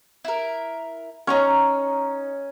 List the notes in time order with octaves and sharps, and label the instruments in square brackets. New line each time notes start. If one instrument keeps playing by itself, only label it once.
[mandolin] E4 A#4
[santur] C#4 [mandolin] D#4 A#5 C#6